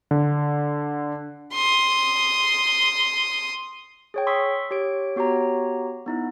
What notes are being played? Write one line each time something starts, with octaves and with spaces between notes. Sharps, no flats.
D3
C6 D#6
G#4 C#5 G5
C6 C#6 D#6 E6 B6
G4 C#5 D7
B3 F#4 G4 C#5 A#5
B3 D#4 E4